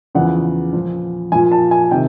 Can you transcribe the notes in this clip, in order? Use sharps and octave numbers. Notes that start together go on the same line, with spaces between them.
E2 C#3 F3 F#5
A#2 F3
A#2 F3 G#5
A5
G#5
C3 D#3 G5